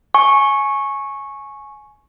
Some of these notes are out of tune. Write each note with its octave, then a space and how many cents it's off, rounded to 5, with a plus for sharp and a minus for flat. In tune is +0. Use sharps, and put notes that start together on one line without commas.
G#5 +20 C#6 -10